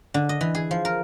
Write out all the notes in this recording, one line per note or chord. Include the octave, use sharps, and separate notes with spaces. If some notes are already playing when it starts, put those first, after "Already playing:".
D3
D#5
E3
G#4
F3
A#4